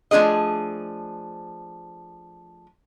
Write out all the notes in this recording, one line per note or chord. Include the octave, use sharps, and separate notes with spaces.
F3 A3 D4 G#4 D#5